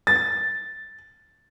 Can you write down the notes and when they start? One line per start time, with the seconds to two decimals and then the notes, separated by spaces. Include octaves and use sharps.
0.07 A6